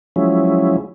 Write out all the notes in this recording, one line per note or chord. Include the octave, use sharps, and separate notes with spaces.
F3 F#3 G#3 C#4 E4